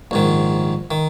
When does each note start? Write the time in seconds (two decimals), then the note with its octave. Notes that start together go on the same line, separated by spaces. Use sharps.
0.11 A#1 G#2 D#3
0.91 D#3